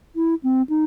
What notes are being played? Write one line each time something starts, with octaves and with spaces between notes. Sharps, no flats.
E4
C4
D#4